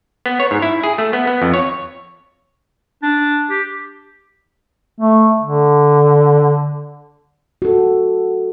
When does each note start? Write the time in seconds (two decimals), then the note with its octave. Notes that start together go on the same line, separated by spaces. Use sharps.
0.26 B3
0.40 C#5
0.51 G#2
0.62 E4
0.83 G#4
0.98 A3
1.13 B3
1.27 B3
1.42 F2
1.54 C#5
3.03 D4
3.50 G4
5.00 A3
5.42 D3
7.62 F#4 A4